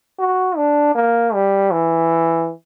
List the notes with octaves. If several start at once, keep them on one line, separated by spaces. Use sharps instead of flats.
F#4
D4
A#3
G3
E3